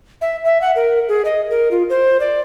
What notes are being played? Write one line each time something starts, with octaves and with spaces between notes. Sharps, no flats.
E5
E5
F#5
A#4
G#4
D#5
A#4
F4
C5
D5